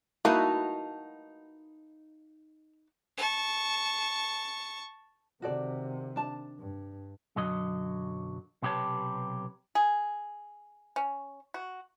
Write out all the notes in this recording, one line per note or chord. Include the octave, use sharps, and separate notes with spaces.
A#3 D#4 E4 F#4 B4 D#5 F5 A5
A5 C#6
C3 D#3 F#4 A4 D5
D4 A5
G2
B1 F#2 D3 F#3 D#5
B1 C3 G4 B4 C#5 A5
G#4
C#4
F#4